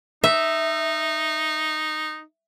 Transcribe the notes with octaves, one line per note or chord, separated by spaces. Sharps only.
D#4 E5